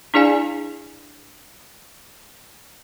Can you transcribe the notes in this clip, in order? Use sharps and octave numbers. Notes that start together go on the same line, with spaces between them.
D4 E4 G#4 D5 F5 G#5